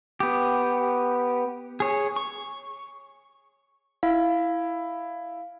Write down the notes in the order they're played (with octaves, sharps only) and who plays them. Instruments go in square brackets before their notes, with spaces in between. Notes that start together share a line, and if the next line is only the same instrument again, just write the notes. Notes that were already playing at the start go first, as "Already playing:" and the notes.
[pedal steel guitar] B3 G4
G#4 C#5
C#6
[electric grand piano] E4 [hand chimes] F5